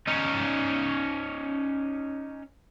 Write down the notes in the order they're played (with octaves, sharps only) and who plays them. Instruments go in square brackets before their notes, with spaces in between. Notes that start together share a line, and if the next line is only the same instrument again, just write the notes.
[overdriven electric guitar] C#4 D#4